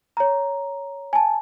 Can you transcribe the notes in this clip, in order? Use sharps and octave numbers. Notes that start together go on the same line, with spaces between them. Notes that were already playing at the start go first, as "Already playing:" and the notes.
C#5 A#5
G#5 A5